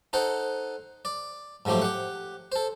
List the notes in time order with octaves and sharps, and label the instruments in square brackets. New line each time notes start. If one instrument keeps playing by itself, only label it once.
[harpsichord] D#4 A4 C5 F#5
D5
G#2 F3 F#3 A3 G4
G4 F#5
A4 C5